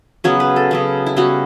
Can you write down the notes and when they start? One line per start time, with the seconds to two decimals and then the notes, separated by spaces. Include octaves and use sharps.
0.24 C#3 F#3 B3 C#5
0.40 B4
0.56 A4
0.71 C#3 F#3 B3
1.06 E4
1.16 C#3 G3 B3 F#4